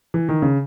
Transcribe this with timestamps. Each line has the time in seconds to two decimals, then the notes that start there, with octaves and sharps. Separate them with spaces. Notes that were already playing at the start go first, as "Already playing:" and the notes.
0.14 E3
0.29 D#3
0.42 C#3